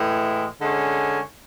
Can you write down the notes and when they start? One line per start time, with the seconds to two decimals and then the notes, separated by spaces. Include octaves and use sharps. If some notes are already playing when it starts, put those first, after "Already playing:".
Already playing: A2 E3 G#3
0.60 D3 G#3 C#4